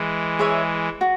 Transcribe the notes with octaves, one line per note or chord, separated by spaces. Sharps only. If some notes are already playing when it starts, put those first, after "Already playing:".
Already playing: E3 G#3
G#4 C#5 E5
F#4